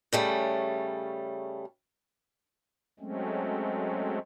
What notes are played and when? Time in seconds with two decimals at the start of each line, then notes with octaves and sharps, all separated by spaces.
0.13 C#3 G3 A3 C#4
3.00 F#3 G#3 A3 C4 C#4